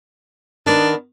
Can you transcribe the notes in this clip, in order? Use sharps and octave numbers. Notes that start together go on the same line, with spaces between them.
D#3 B3 D4